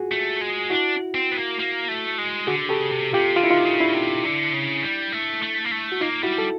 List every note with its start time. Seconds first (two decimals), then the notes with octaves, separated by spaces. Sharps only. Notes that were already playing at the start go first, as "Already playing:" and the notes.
Already playing: F4 F#4 G#4
0.12 A3
0.41 G#3
0.70 D4 E4 F#4
1.14 C4
1.31 B3
1.37 A#3
1.59 A#3
1.88 A3
2.18 G#3
2.47 D3 F#4 G#4
2.69 C#3 G4 A4
2.91 C3
3.13 C3 F4 G4
3.36 D3 F4
3.44 E4
3.50 D#4 F4
3.58 C3
3.65 C#3
3.80 D4 E4
3.95 C3
4.25 D3
4.54 C#3
4.84 G3
5.13 A3
5.43 A3
5.65 A#3
5.72 A3
5.92 F#4
6.01 A#3 D#4 F4
6.23 G3 E4 F#4
6.38 A4